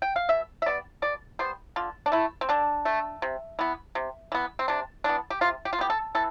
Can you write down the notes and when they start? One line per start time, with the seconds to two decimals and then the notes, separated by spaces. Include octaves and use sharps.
0.02 G5
0.16 F5
0.29 B2 E5
0.62 E5
0.66 G3 B3 D5
1.02 B2 D5
1.39 G3 B3 C5
1.76 D3 F4
2.06 D4
2.12 A3 E4
2.41 C4
2.49 D3 D4
2.85 A3
3.22 C3
3.59 E3 B3
3.95 C3
4.32 E3 B3
4.59 C4
4.68 C3 D4
5.04 E3 B3 D4
5.30 G4
5.41 C3 F4
5.65 G4
5.73 F4
5.79 E3 B3 G4
5.90 A4
6.15 E3 A4